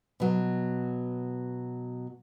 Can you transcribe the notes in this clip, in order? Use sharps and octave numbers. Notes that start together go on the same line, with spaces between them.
B2 F#3